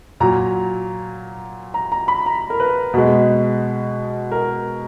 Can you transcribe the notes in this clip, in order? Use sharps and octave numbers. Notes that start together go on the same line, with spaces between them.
A#2 F#3 A#5
A#5
A#5
B5
A#5
A#4
B4
B2 G#3
A#4